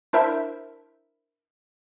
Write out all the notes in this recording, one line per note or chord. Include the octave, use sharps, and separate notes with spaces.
D4 E4 A#4 C5 E5